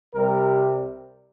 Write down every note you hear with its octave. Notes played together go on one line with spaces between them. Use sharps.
C2 C3 G3 A#4